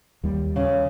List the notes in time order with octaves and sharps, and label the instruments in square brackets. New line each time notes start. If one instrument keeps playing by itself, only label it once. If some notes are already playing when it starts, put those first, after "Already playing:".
[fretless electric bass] D#2 G3
[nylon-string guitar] C#3